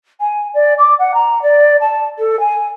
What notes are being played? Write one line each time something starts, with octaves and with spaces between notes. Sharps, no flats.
G#5
D5
D6
F#5
A#5
D5
A5
A4
G#5